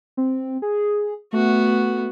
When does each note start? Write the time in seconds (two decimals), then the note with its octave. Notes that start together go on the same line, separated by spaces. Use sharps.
0.17 C4
0.62 G#4
1.33 A3 B3 F#4